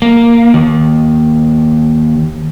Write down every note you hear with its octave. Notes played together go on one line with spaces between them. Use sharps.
A#3
D#2